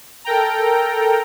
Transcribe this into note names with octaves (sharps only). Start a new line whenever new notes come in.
A4 A#4 G5 A#5